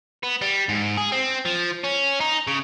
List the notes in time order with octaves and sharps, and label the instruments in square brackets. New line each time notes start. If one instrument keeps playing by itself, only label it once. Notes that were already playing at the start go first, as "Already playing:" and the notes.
[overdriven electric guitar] B3
G3
G#2
G#4
C4
F3
C#4
D#4
C#3